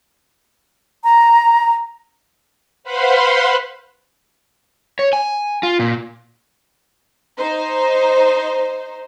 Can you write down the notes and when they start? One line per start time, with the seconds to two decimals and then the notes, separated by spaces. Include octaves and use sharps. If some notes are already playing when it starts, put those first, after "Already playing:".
1.04 A#5
2.83 B4 C5 F5 F#5 B5 C6
4.99 C#5
5.13 G#5
5.63 F4
5.79 A#2
7.39 D#4 C5